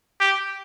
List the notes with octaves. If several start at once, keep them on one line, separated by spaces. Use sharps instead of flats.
G4